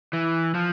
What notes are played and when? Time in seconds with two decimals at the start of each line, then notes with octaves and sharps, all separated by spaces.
0.13 E3
0.54 F3